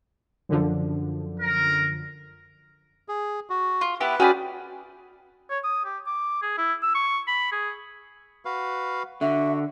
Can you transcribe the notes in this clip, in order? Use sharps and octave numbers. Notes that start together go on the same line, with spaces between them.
F#2 D3 F3
A#4
G#4
F#4
F4
B3 E4 G4 B4
C#4 F#4 G#4 D5 G5 B5
C#5
D#6
G4
D6
G#4
E4
E6
C#6
B5
G#4
F#4 B4 F5
D3 F#4 E5